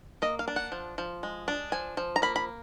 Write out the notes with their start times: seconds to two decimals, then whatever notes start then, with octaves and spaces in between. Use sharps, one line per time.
0.22 A#3 D#5
0.39 F5
0.48 D4
0.56 F#5
0.72 F3
0.98 F3
1.23 G#3
1.48 D4
1.72 F3 G#5
1.97 F3
2.16 A#5
2.22 A#3 B5
2.36 B5